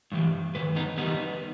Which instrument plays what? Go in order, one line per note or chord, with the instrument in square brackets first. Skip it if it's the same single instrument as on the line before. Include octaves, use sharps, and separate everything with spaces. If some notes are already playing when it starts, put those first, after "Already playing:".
[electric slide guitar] G2 E3 G3
G2 D#3 B4
B3 D#4
E2 D#3 G3 B3 D#4